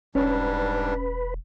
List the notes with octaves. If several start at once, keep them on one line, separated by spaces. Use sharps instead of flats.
E1 G#2 G3 C#4 D4 B4